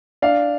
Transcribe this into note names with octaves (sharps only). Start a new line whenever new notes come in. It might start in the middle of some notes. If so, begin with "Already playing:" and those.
D4 F5